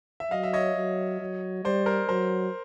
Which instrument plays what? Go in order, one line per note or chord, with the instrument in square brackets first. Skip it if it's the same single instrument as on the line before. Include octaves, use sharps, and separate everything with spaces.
[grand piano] E5
[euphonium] F#3 [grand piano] D#5 F5
[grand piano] E5
C#5 D#5
[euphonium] F#3
F#3
[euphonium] G3 [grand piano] C5 D5
[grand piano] A#4 C5
[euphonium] F#3 [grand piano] A#4 C5